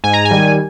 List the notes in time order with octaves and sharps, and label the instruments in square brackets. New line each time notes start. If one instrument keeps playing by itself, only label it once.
[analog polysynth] G#2 G#5
A#5
G#5
D#3 G3